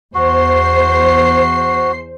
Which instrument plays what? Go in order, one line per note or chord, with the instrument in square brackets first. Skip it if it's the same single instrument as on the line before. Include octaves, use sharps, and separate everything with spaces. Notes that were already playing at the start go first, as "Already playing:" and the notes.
[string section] E2 C5 C7 [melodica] F#4